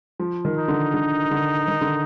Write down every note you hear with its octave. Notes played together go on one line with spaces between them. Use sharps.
F3
D#3
D#4
D3
D3
D3
D#3
D3